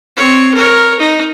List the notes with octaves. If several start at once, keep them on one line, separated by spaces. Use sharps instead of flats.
C4 C#5
A#4 C#5
D#4